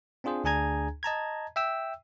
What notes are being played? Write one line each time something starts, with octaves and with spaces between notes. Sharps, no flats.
C4 D4 F4 G#4 C5
D2 D4 G#4 G#5 A#5 G#6
D#5 A5 A#5 G#6
E5 G5 E6